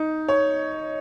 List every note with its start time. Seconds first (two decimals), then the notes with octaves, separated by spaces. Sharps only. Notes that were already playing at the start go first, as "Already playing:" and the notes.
Already playing: D#4
0.28 C#5